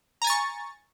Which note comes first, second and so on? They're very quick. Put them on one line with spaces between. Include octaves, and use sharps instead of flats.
A#5 G#5 A6 C#6